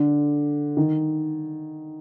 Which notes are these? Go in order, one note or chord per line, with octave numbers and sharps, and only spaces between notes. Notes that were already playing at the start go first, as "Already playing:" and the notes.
Already playing: D3
D#3